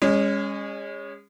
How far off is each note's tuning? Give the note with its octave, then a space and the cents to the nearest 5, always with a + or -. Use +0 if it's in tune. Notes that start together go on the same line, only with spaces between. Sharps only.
G#3 -30 C#4 +0